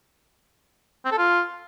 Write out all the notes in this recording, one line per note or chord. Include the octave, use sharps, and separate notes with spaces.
C4
A4
F4